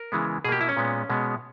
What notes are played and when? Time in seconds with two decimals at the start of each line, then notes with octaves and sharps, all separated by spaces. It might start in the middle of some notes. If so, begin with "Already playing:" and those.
Already playing: A#4
0.12 C#3 E3 G#3 B3
0.44 B2 G#4
0.49 A#3 G4
0.61 E4
0.69 C#4
0.77 A#2 G#3 B3
1.10 B2 G#3 B3